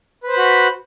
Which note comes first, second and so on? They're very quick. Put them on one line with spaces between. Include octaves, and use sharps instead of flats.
B4 C5 B5 F#4